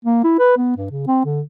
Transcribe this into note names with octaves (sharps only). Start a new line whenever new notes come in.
A#3
E4
B4
B3
G2
C#3
C4
D3